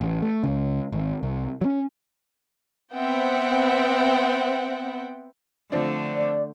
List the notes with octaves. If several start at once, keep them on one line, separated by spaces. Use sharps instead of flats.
A1
A3
C#2 C#3
G#1
C2
F#3 C#4
B3 C4 E5 F#5 G5
D3 F3 A3 C4 D4
D5